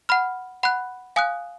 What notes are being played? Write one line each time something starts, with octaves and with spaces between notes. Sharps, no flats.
F#5 B5 F6
F#5 B5 F#6
F5 G#5 D#6 F#6